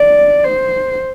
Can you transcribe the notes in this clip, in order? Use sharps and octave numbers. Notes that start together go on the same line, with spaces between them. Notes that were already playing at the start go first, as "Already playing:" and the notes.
Already playing: D5
C5